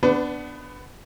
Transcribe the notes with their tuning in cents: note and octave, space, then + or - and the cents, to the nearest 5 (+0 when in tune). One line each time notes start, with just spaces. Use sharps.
B3 +10 D4 +0 B4 +40